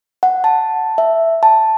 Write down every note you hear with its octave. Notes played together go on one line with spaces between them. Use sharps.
F#5
A5
E5
A5